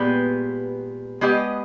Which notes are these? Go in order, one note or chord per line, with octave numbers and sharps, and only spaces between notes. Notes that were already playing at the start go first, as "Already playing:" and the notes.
Already playing: A#2 G#3 B3 G4 B4
G#3 B3 G4 B4 D#5